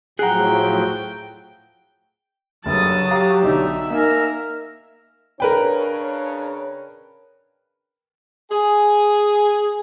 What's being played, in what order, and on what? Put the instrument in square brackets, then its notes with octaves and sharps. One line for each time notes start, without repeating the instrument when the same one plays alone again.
[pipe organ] A2 F3 F#3 [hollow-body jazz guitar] G#4 F#5 [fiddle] G5 [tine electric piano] A#5 F#6
[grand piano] F#1 A4 [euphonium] G2 [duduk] F#3 [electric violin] A5 D#6
[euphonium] G4 [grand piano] F5 A#5 D6
[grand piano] B1 D3 D5 [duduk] D#4 [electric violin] E5
[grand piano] A#3 F5 G#5 [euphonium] D#4 [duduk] A#4
[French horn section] C#3 D4 C#5 [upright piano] A#4 B4 G5
[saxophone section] G#4